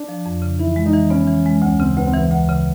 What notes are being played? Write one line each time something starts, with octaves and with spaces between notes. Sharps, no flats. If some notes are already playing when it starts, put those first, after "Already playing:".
Already playing: D4
F3
F2
C#3
E3 E4
G#3
D#4
E3
B3 C#4
E3
G#3
D2 C#4
C#3 C4
D2 B3
C4
E3 B3
D2
C#3